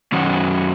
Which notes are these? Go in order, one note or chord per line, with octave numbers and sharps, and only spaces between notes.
F#2 D#3 F#3 C#4 F#4